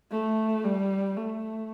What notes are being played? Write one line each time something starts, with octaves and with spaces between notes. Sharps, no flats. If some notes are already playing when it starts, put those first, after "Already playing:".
A3
G3
A3